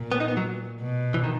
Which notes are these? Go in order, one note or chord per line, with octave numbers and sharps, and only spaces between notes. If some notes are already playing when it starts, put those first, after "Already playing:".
Already playing: A#2
B3
D#4
B3
F#3
B2
E3
D#3